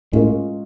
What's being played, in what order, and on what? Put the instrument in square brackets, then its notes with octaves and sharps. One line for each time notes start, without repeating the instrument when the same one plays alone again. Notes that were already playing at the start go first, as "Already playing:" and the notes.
[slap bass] A2 [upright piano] G#3 C#4 F4 A#4